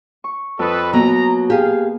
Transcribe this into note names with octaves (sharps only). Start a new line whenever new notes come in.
C#6
F2 A4 B4 D#6
B2 F#3 A#3 B3 A#5
G4 G#4 F5